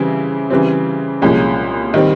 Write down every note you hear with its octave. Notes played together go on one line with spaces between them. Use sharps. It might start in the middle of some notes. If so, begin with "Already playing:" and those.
Already playing: C#3 E3 G3 C4 E4
C#3 E3 G3 C4
C2 A#2 F3 G#3 C#4
D#3 G3 C4